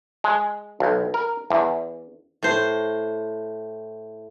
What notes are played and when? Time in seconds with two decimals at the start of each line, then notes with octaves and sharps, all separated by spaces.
0.24 G#3
0.80 B1
1.14 A#4
1.50 E2
2.43 A2 C5